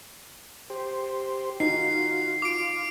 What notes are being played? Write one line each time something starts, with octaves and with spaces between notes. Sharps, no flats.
G4 C5
D#4 F4 F#4 C7
F4 D6 D7